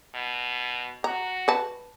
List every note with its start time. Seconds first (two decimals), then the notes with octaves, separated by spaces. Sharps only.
0.14 B2
1.04 F#4 A#5
1.48 B4 A5